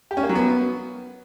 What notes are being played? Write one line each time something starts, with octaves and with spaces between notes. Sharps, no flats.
G4
C#4
A#3
F#3
B3